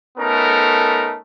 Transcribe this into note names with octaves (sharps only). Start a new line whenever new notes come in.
A3 B3 C#4 D#4 A4 A#4